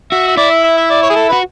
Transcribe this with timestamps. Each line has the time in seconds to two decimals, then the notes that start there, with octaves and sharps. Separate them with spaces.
0.12 F#4 E5
0.28 E5
0.37 E4 D5
0.51 E5
0.64 E5
0.77 E5
0.90 D5
1.03 C#5
1.10 G#4
1.16 A4
1.29 F#4 B4